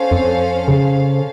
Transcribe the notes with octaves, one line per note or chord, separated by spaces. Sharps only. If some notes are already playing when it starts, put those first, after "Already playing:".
Already playing: C#4 A4 C5 F5
F2
C#3